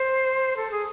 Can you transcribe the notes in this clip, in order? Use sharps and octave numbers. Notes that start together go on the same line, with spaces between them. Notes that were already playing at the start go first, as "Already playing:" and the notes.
Already playing: C5
A4
G#4